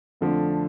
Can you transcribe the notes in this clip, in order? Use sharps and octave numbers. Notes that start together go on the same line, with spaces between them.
F2 D3 F3 A3 D4